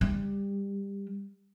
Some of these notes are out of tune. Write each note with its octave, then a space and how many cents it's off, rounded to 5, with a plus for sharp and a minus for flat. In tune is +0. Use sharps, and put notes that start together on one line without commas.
G3 +20